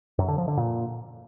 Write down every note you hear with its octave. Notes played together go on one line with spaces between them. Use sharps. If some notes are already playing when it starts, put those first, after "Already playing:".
F#2
D3
F3
D3
A#2